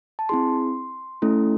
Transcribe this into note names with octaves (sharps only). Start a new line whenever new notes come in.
A5
C4 E4 G#4 C6
A3 C#4 E4 A4